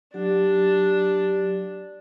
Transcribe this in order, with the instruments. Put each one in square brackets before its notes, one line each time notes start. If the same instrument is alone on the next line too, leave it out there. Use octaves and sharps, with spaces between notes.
[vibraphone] F#3 G4 [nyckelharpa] D4